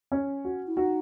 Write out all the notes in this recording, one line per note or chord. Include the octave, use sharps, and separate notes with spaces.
C#4
F#4
E4
D#4 F#4